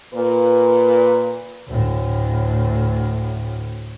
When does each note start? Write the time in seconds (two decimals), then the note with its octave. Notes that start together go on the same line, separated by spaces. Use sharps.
0.14 A#2 B4
1.68 D2 A2